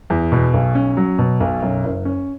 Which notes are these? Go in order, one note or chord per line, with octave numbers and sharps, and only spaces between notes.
E2
B2
B1
C#4
F#3
B2
B1
F#2
F#1
C#4